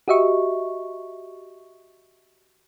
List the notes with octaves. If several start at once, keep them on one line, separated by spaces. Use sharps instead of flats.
F#4 G4 D#5 E5 C#6